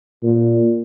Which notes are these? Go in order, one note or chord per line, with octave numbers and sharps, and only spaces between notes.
A#2